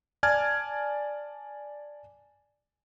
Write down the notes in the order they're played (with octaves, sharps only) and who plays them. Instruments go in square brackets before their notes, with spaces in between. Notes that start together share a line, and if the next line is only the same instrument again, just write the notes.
[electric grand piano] D5 G#5 A5 F6 G#6